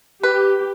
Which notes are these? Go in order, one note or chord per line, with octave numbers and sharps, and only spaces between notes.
G4 B4